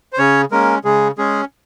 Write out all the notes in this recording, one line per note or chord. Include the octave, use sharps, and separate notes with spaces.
C5
C#3 C#4 C#5
G#3 A#3 C#4 A#4
C#3 G#3 G#4
G#3 C#4 G#4